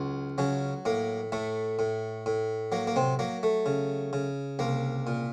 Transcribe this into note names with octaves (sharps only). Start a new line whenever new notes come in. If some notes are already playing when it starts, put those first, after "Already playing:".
Already playing: C#2 F#3
C#3 F#3 C#4
A2 A#3
A2 A3
A2
A2
F#3 A#3
A#3
C3 C4
F#3 A#3
A3
C#3
C#3
C2 A#3
A#2